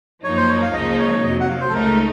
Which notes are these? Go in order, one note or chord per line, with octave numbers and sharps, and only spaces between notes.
F#2 F3 A#3 D#4 C#5
C5
C#5
F5
C#2 C#3 F3 A#3 D#4 D#5
C#5
F2 C3 F#3 D#5
F#5
F5
C5
A4
C#2 C#3 A3 D#4 A#4